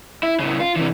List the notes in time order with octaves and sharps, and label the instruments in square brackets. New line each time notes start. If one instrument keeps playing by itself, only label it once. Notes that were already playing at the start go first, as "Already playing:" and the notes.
[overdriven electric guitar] E4
C#3 E3
F4
C3 E3